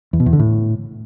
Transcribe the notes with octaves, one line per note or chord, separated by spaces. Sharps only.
E2
B2
E2
D3
A2